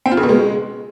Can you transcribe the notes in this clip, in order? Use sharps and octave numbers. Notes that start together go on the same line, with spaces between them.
C4
F4
C#3
B2
G#3